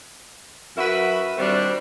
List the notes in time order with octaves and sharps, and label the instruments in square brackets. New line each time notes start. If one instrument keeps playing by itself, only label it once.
[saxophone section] F#2 F#4 A#4 B4 E5
D#3 G3 C4 D4 F#4 C5